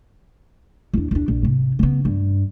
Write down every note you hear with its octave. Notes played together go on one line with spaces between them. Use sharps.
E2 D4
E2 D4
A#1
G#2 C3
C#3 B3
G2